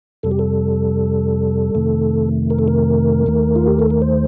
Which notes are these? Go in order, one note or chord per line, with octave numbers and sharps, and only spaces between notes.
F2 C3 G3 A4
G4
A4
F2 C3 D#3 A3
A#4
A4
A#4
D#2 D#3 A3
F4
G4
A4
A#4
C5